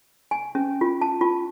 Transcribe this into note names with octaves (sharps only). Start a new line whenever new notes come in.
G#5
C#4
F4
A5
F4